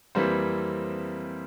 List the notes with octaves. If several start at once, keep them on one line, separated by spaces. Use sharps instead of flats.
F2 E3 G3 A#3 C4 C5